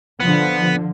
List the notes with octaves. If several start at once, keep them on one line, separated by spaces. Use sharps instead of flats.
D3 F3 B3